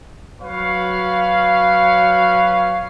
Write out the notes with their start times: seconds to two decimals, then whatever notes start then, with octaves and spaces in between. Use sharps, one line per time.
0.42 F#3 F#4 B4 C#5 F5